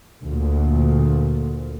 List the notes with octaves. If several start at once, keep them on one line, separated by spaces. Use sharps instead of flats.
D2 A#2